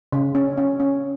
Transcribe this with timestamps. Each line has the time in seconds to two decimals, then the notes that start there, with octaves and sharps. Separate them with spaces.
0.12 C#3
0.35 C#4
0.57 C#4
0.80 C#4